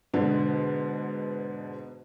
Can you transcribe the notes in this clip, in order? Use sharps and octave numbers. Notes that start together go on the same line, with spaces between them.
G#2 B2 D3